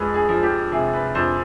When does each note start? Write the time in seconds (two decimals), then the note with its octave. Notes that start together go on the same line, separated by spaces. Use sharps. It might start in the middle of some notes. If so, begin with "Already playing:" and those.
Already playing: F2 G#3 B4
0.14 G#4
0.29 F3
0.43 G4
0.72 C3 G#4
0.93 B4
1.15 F2 C5